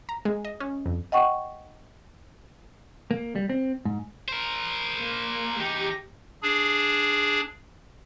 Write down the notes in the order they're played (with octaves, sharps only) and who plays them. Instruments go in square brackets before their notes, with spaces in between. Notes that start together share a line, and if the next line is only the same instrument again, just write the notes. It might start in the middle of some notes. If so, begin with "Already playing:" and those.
[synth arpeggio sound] A#5
G#3
D#5
C#4
F2
[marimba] D#5 F#5 G5 C#6
[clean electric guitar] A#3
G3
C4
G#2
[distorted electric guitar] A#4 C5
[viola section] A#3
[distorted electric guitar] E2 D#4 [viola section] G4
[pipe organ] D4 G#4